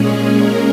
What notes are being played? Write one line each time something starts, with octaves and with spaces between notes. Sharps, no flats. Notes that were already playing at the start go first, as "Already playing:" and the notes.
Already playing: A#2 G#3 C#4 G#4
A#4